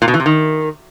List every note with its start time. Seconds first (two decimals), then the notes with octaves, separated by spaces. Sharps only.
0.02 A#2
0.08 B2
0.14 E3
0.20 C3
0.26 D#3